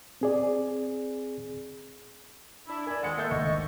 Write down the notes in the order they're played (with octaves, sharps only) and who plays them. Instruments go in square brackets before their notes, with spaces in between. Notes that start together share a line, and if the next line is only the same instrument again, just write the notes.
[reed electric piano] C4 G#4 D5
[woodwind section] D4 E4
[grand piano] A#4 D5 [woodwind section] G#5
[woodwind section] F2 D#3 G#3 [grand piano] F#5 C#7
[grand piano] A#3 E5 G6 [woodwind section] A4
[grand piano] G#1 D2 [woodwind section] D#5 C#6